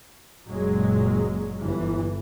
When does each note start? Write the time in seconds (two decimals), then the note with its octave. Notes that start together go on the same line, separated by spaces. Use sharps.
0.48 F#1 A#2 F#3 G#3
1.60 G1 E3